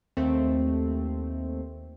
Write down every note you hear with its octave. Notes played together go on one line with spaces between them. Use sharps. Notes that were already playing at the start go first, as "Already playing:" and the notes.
D#2 A3 C4